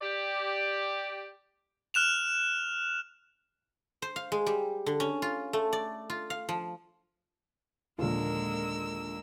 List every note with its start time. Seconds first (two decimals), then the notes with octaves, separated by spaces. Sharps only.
0.02 G4 D5
1.94 F6 F#6 E7 F7
4.02 C5
4.16 F5
4.32 G#3
4.46 G3
4.86 D3
5.00 C#4
5.22 F4
5.53 A3
5.73 D5
6.10 F4
6.30 F5
6.49 F3
7.98 A#1 D#2 D3 G#3 F4 A#4 E6